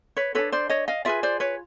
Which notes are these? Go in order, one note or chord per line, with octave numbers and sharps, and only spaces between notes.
B4 C#5
D4 F#4 A4 B4 C#5
C5 D5
C#5 D#5
D#5 F5
F4 G#4 B4 D5 E5
C5 D5
B4 C#5